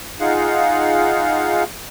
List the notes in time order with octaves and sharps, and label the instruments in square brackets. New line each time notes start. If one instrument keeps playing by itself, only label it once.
[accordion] D#4 F4 G#4 F5 F#5